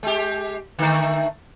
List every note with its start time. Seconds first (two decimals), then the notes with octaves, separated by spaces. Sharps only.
0.03 G#3 G4
0.79 D3 D#3 A3